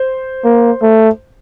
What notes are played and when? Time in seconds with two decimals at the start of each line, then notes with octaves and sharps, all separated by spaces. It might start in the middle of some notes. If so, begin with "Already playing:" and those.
Already playing: C5
0.44 A#3
0.82 A3